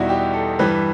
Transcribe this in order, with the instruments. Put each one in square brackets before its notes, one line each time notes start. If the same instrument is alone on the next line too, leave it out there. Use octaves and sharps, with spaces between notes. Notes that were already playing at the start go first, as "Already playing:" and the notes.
Already playing: [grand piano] E2 B2 G3 D#4 E4 F#4
G4
A4
G2 E3 G3 B4